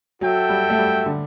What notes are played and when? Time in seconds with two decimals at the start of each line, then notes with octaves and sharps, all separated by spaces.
0.21 F#3 F#4 A4 E5 G5
0.49 G3
0.70 A3
0.78 G3
1.06 D3